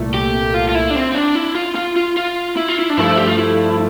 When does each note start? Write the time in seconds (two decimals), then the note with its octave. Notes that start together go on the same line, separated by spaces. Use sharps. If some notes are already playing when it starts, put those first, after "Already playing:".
Already playing: C2 A#2 A3
0.14 G4
0.54 F4
0.69 F4
0.75 E4
0.90 D4
0.95 C4
1.12 C4
1.15 D4
1.35 E4
1.55 F4
1.75 F4
1.96 F4
2.17 F4
2.57 E4
2.68 F4
2.79 E4
2.90 D4
2.97 G2 F3 A3 E4
3.17 G4
3.27 F4
3.38 E4